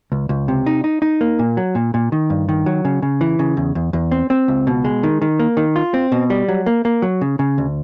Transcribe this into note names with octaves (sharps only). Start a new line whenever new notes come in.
C#2
C#2
C3
D#4
D#4
D#4
A#3
A#2
F#3
A#2
A#2
D#3
G2
D#3
F#3
C#3
C#3
E3
C#3
E2
E2
E2
C4
C4
C#2
B2
G#3
D#3
D#3
A#3
D#3
F4
C4
B2
G3
F#3
A#3
A#3
F#3
C#3
C#3
D2